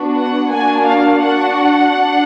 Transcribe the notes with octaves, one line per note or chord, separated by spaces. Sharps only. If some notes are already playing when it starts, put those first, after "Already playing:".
Already playing: B3 D4 F#4
F#5
A#3 D4 F#4 G#5
F5
D4 F#4 F#5
D4